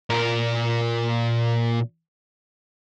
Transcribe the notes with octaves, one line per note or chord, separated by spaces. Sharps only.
A#2 A#4